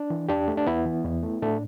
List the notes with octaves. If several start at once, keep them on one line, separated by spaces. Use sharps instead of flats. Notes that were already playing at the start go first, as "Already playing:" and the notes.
Already playing: D4
E3
E2 D4 G4
A3
D4
E2 B3 E4
E3
E2
A3
A2 A3 D4